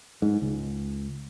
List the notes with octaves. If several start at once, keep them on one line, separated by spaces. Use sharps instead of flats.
G#2
C#2